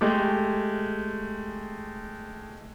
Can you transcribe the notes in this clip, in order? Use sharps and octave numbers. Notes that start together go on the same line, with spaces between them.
G#3 A3 G4